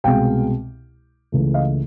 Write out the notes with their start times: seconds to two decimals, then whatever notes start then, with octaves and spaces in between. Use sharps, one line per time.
0.04 C2 B2 G#3 F5 G5
1.32 C#2 C#3 E3 A3
1.54 D#5 F5